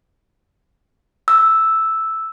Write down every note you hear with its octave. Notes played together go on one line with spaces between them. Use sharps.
E6